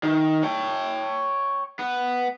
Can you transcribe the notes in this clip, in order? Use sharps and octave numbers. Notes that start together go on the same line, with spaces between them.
D#3
C#5 G5
B3